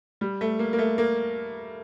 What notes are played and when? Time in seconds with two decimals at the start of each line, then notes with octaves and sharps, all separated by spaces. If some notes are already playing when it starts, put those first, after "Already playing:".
0.21 G3
0.41 A3
0.59 A#3
0.73 A#3
0.79 A3
0.98 A#3